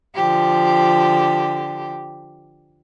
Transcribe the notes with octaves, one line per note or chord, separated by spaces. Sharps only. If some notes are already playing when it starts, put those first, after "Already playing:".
D3 F3 G4